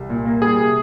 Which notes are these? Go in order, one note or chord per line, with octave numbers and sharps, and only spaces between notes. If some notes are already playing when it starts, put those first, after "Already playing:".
Already playing: C2
A#2
A#3
G3 G#4
C3